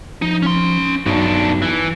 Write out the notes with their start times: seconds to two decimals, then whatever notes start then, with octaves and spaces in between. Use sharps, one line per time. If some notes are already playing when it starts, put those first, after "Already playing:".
0.22 F3 D#4
0.42 C#4 C6
1.06 B1 G2 B2 D4
1.62 E3